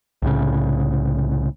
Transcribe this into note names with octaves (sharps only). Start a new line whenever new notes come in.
C2 A2 C#3